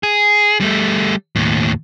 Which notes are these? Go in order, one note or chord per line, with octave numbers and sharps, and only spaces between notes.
G#4
G3 A3
D#2 A2